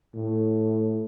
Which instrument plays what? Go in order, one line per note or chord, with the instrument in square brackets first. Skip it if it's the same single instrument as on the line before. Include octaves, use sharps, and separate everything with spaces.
[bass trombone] A2